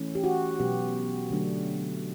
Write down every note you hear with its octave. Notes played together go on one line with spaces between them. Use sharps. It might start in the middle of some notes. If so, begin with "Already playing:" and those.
Already playing: E3 A3 C#4
G4
F#4
B2 F#3 B3 G4
D3 F#3 A3 D4